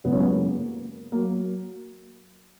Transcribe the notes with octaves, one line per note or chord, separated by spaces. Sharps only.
F#2 C#3 E3 G#3 B3
C#4
B3
A#3
A#3
F#3 A#3